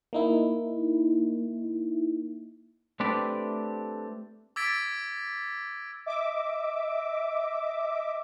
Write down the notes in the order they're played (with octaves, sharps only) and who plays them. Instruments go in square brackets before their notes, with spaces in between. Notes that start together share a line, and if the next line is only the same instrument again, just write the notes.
[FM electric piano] A#3 D#4 E4
[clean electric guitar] A3 C4 D4 G4 B4 D5
[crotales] D6 E6 G#6 A6 B6 D7
[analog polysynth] D#5 E5 D6